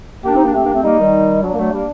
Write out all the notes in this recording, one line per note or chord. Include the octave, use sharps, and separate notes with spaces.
A#3 D4 G4
C4 D#4
A#3 D4
A3 C4 G4
A#3 D4
A3 C4
G3 A#3 D#4
D#3 G3
F#3 D4
A#3
F#3 A3
G3 A#3